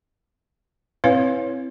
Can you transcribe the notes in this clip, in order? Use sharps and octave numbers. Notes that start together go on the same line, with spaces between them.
C4 E4 B4 C#5 F5